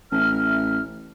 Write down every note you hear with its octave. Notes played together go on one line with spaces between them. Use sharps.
A1 E5 F6